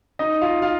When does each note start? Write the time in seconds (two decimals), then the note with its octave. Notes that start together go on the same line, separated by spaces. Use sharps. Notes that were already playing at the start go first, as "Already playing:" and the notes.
0.19 D#4 D#5
0.41 F4 F5
0.62 F4 F5